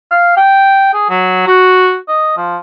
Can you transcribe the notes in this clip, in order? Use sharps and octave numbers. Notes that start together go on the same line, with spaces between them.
F5
G5
G#4
F#3
F#4
D#5
F3